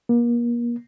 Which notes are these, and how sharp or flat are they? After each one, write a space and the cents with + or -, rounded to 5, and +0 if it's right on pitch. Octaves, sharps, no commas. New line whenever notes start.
A#3 +35